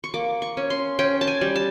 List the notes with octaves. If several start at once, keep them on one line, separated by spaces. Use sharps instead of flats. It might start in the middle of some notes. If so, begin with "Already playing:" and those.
C#6
A#3 D6
C#6
C#4
C6
C#4 G5
A5
G#5
G3
A5